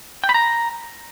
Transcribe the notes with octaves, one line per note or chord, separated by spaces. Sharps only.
G5
B5
A#5